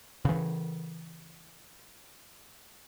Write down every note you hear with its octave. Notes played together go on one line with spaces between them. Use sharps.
C#3 E3